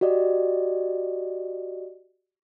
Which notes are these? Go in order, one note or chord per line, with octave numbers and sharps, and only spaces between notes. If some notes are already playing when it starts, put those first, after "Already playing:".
F#4 G4 D5 D#5